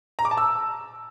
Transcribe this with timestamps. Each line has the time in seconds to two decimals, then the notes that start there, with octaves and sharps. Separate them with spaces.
0.19 A#5
0.25 D6
0.31 A5
0.37 E6